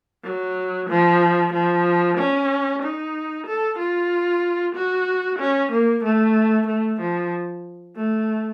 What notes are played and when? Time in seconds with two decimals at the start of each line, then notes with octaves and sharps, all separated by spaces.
0.24 F#3
0.90 F3
1.54 F3
2.18 C#4
2.83 D#4
3.47 A4
3.79 F4
4.75 F#4
5.40 C#4
5.72 A#3
6.04 A3
6.68 A3
7.01 F3
7.97 A3